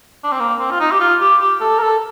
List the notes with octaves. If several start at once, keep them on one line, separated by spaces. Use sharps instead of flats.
D4
C4
A#3
C4
F4
D#4
G4
F4
G4
G4
A4
A#4
A4